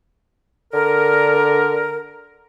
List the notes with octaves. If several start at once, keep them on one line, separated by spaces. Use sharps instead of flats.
D3 A#4